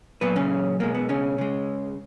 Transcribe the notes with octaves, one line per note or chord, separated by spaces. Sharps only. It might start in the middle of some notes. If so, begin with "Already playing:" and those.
A#2 F#3 B3 B4
C#3 C#4
B2 G#3 A#3
B3
C#3 C#4
C#3 G#3